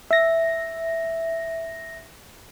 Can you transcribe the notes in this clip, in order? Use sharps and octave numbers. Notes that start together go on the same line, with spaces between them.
E5 A#6